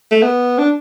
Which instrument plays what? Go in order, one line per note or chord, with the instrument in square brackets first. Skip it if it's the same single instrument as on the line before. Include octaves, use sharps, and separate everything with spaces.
[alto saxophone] A3
B3
D4